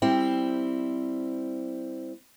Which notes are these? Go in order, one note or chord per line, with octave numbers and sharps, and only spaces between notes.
G3 C4 E4